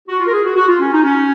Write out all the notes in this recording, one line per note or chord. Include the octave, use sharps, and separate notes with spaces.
F#4
F4
A#4
G#4
F#4
F#4
F4
C#4
D#4
C#4